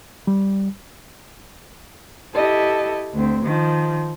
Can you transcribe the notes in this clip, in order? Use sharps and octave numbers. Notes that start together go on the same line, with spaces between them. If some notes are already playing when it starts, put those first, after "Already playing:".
G3
E4 G4 A4 D#5
D2 C4
D#3 F3